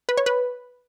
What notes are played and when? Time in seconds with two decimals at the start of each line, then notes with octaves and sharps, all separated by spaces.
0.09 B4
0.17 C#5
0.26 B4